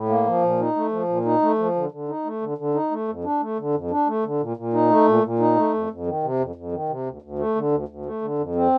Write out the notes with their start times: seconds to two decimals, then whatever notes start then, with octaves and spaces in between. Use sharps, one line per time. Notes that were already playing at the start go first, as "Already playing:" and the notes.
Already playing: A2
0.09 A#3
0.26 F3
0.42 A#2
0.60 D#4
0.76 A3
0.92 F3
1.08 A#2
1.25 D#4
1.42 A3
1.58 F3
1.75 D3
1.91 D3
2.09 D#4
2.25 A3
2.41 D3
2.58 D3
2.74 D#4
2.91 A3
3.08 F2
3.24 D4
3.41 A3
3.58 D3
3.74 F2
3.91 D4
4.07 A3
4.24 D3
4.41 A#2
4.57 A#2
4.74 D#4
4.90 A3
5.07 A#2
5.23 A#2
5.39 D#4
5.56 A3
5.74 F2
5.90 F2
6.06 D#3
6.23 C3
6.39 F2
6.56 F2
6.72 D#3
6.89 C3
7.06 D2
7.22 D2
7.39 A3
7.55 D3
7.72 D2
7.88 D2
8.06 A3
8.22 D3
8.39 F2
8.55 C4